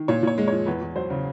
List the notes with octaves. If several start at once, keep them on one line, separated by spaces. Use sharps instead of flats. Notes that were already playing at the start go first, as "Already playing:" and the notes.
Already playing: D#3
A#2 C#5
A#2 C#5
G#3
F3 C#5
E2 B4
E2
F#3 C5
C#3